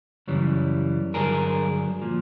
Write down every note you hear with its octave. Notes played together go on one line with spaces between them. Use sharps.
F#2 C#3 E3 G3
G2 D3 F#3 G#4 A#4
A#2 F3